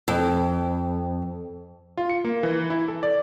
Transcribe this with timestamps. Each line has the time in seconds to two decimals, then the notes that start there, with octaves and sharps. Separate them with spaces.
0.08 F2
1.97 F4
2.10 C#7
2.24 A#3
2.43 E3
2.70 E4
2.88 A4
3.03 D5